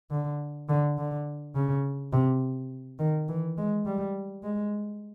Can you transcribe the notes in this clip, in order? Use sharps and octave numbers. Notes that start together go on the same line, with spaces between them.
D3
D3
D3
C#3
C3
D#3
E3
G#3
G3
G#3